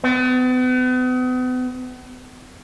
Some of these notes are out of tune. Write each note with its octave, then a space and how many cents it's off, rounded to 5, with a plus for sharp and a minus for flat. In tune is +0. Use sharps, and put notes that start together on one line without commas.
B3 +40